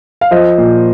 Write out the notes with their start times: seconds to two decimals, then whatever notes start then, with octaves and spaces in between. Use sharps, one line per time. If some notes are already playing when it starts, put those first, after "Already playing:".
0.21 F5
0.31 F3 C5 D#5
0.58 A#2